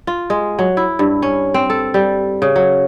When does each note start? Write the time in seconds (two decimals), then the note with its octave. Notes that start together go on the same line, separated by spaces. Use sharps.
0.07 F4
0.30 G#3
0.59 F#3
0.77 E4
0.99 G2
1.22 C#4
1.54 C4
1.70 A4
1.94 G3
2.42 C#3
2.56 F#3